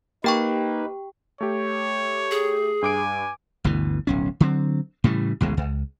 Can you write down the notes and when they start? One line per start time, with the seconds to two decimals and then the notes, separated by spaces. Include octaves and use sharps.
0.24 A#3 D#4 G4 B4 G5 C#6
1.41 A3 G4 C#5
2.31 G#4
2.82 G2 G#5 D6 D7
3.64 G1 D2 B2 E3
4.07 D1 B1 C#4
4.40 D3 F#3 C4
5.04 A2 C#3 E3 G3
5.41 A1 D2 B2 G#3
5.57 C#2